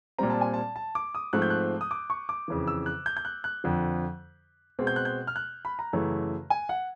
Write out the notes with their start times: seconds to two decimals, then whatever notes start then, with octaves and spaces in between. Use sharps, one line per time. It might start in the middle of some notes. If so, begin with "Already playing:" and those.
0.18 A#2 G3 C4 A#5
0.30 A5
0.41 G#5
0.54 A5
0.76 A5
0.95 D6
1.15 D#6
1.33 G#2 F3 A3 C4 F#6
1.42 G6
1.50 F#6
1.81 D#6
1.91 D6
2.10 C#6
2.29 D6
2.48 F2 C#3 E3
2.68 E6
2.86 F#6
3.06 G6
3.17 G6
3.25 F#6
3.44 F#6
3.64 F2 D3 F3
4.79 B2 G#3 C4
4.87 G6
4.96 F#6
5.05 G6
5.27 F6
5.36 F#6
5.65 B5
5.79 A#5
5.93 F#2 C#3 E3 A3
6.50 G#5
6.69 F#5